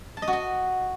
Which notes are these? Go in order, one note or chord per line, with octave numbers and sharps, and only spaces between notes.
A5
D#5
F#4
D#5